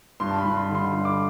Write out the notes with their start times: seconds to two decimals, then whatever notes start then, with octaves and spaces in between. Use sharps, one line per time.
0.20 G2 C6
0.30 A5
0.38 B5
0.45 G2
0.57 C6
0.69 D3
0.75 C6
0.93 G2 C6
1.05 D6